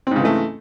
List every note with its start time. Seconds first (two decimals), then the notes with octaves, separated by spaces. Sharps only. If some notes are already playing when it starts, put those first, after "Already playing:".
0.07 C4
0.11 G#2
0.16 C#3
0.20 E3
0.25 A3